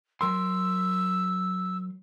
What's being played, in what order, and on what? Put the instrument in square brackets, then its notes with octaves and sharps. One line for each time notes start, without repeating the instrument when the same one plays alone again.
[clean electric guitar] F#3 A#4 C6 [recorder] E6